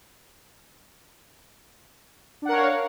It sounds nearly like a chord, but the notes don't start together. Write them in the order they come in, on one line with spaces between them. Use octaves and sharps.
D4 F#5 A#4 C#5 F5